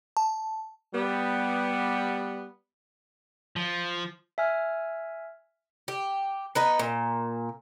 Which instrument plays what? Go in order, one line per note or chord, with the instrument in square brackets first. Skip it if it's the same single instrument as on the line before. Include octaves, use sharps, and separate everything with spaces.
[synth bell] A5
[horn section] G3 B3
[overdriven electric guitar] F3
[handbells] E5 G#5 F6
[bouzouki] G4
B3 D#4 B4
A#2